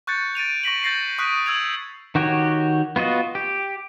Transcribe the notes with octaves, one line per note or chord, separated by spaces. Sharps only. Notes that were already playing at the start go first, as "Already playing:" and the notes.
C#6 F#6 G6 A6 C#7
A6 D7 D#7 F7
C#6 A#6 B6 F#7
G6 A6 A#6 C7
C#6 D#6 F#6 B6 D7 D#7
E6 G#6 F7
D#3 F#4 G4 C#5
B3 F4 F#4 D#5
G4